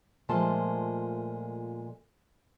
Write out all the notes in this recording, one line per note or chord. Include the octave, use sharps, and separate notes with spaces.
A#2 F3 G#3 A3 A4 A5